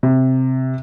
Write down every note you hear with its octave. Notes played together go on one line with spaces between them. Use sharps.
C3